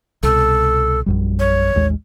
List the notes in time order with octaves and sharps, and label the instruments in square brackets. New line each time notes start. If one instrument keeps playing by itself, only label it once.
[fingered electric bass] C2 B2 [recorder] A4
[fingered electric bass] A#1 F#2 G3
[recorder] C#5
[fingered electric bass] A1 D#2 G#3